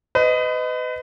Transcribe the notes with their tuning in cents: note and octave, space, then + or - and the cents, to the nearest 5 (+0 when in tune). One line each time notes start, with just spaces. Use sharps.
B4 +35 D#5 +0